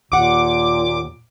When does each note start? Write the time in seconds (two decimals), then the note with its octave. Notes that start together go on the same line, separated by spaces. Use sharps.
0.12 D#2 A#2 F#5 D6